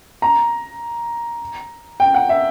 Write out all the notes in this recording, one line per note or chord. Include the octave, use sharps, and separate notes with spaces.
A#5
G5
F#5
E5